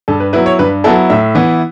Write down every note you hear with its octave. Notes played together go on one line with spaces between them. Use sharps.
G2 A4
B4
F#3 B3 E4 B4
C#5
G2 B4
F#3 B3 E4 A4
A2 E5
E3 B3 E4